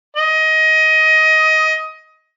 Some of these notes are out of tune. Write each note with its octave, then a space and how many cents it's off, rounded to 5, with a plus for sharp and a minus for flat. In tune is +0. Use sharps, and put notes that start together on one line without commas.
D#5 +20